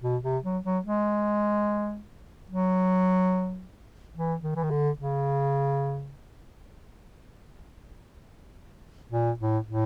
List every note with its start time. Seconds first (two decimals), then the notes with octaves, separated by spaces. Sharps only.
0.03 B2
0.23 C3
0.44 F#3
0.64 F#3
0.85 G#3
2.50 F#3
4.16 E3
4.43 D#3
4.56 E3
4.63 D#3
4.71 D3
4.98 C#3
9.12 A#2
9.39 A2
9.67 A2